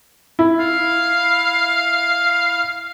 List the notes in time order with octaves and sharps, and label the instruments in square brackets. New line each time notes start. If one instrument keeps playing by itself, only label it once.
[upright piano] E4
[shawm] F5